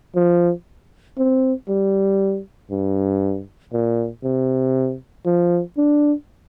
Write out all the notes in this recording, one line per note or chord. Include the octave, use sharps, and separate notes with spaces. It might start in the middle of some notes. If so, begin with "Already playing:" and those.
F3
C4
G3
G2
A#2
C3
F3
D4